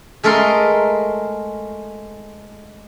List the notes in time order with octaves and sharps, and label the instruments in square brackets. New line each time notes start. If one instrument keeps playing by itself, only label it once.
[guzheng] G#3 A3 A4 A#4 D#5 C6